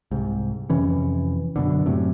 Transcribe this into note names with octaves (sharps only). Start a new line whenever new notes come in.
C2 G#2
F2 C3 E3 C#4
F#2 B2 D3
F#2 A2 C3